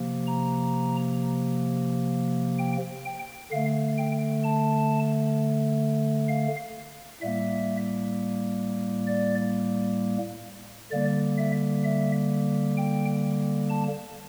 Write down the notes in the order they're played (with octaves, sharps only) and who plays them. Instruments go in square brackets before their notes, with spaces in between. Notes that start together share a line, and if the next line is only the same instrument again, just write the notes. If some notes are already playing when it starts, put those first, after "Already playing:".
Already playing: [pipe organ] C3 F3 A#3
A#5
G5
G5
D3 A3 F5
G5
A5
F5
A2 G3 A#3 E5
D5
D3 G3 A#3 D5
E5
E5
G5
A5